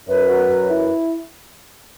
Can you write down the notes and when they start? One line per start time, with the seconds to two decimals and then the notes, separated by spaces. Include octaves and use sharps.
0.08 F#2 B4
0.28 F#3
0.49 F#2
0.69 E4